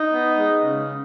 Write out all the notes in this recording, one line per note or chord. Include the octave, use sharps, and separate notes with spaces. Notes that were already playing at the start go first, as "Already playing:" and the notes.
Already playing: D#4
B3
G#3
C#3